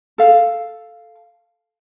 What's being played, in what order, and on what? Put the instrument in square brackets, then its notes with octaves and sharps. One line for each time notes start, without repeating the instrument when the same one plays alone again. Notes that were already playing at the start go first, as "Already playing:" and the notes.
[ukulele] A4 F5